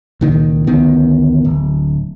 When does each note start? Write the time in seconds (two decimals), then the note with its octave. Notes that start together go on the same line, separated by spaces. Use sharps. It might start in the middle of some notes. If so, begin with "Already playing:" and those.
0.21 C#2 A#2 D#3
0.67 A1 D2 D#3 B3
1.45 D1